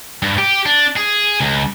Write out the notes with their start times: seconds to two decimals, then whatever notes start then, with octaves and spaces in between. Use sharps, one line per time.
0.23 G2
0.38 G4
0.66 D4
0.97 G#4
1.40 C#2